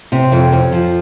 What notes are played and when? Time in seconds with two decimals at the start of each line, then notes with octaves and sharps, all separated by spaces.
0.12 C3
0.32 F2
0.52 F2
0.72 F3